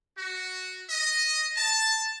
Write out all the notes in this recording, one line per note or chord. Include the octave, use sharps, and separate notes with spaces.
F#4
D#5
A5